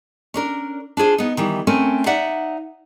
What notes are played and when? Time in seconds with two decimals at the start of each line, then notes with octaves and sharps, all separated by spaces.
0.34 C#4 D4 A#4
0.97 D4 F4 G#4 C5
1.18 B3 D#4
1.37 D#3 E3 G3
1.67 A3 C4 C#4 A#4 G#5
2.06 D#4 D5 E5 F#5